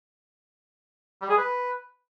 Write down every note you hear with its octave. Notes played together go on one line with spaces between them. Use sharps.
G3
G#4
B4